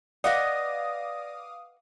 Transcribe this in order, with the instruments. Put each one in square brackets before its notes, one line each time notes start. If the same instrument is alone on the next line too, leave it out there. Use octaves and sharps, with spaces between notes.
[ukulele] B4 D#5 F#5 [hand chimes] D5 A#6 [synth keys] F5 D6 D#6